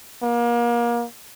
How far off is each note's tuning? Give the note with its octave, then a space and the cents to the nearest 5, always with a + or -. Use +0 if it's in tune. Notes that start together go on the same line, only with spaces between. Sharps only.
A#3 +30